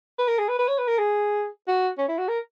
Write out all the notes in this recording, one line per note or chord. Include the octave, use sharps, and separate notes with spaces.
B4
A#4
G#4
B4
B4
C#5
B4
A#4
G#4
F#4
C#4
E4
F#4
A#4